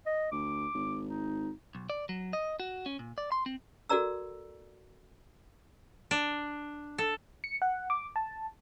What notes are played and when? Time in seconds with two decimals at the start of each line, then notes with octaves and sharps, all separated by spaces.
0.06 D#5
0.32 D2 D6
0.75 G#1
1.07 D#4
1.75 B1
1.90 D5
2.09 F#3
2.33 D#5
2.60 F#4
2.86 C#4
2.99 A#2
3.18 D5
3.32 C6
3.46 C4
3.90 F#4 A4 A#4 D5 A#5 E6
6.11 D4
6.98 A4
7.44 C#7
7.62 F#5
7.90 D6
8.16 A5